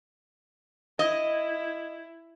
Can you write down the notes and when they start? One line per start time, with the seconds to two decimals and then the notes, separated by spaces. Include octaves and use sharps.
0.99 E4 D#5